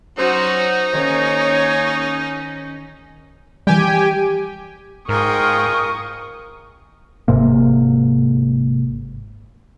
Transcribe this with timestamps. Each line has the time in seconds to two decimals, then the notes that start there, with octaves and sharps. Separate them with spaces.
0.18 F#3 C#4 D#4 F#4 C5
0.93 D#3 A#3 C#4 G#4 C#5
3.67 E3 G3 G4 G5 G#5
5.09 G#2 F4 G#4 A#4 G5 C#6 D#6
7.28 G1 G#2 C3 A#3